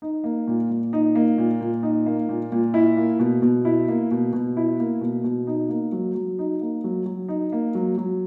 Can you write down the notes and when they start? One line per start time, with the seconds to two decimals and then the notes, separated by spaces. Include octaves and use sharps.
0.02 D#4
0.24 A#3
0.47 A#2
0.70 A#2
0.93 D#4
1.15 A#3
1.38 A#2
1.60 A#2
1.83 D#4
2.06 A#3
2.29 A#2
2.52 A#2
2.74 E4
2.97 A#3
3.19 B2
3.42 B2
3.65 E4
3.88 A#3
4.11 B2
4.33 B2
4.57 E4
4.80 A#3
5.01 B2
5.24 B2
5.47 D#4
5.69 A#3
5.92 F#3
6.15 F#3
6.39 D#4
6.61 A#3
6.84 F#3
7.06 F#3
7.28 D#4
7.52 A#3
7.75 F#3
7.98 F#3